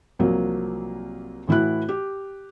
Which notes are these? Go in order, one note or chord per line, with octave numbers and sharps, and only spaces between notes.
C2 F3 F#3 A#3
A2 E3 E4 F#4 F#6
G4